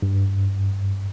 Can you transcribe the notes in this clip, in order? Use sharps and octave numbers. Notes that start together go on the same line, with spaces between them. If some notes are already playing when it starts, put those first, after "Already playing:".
G2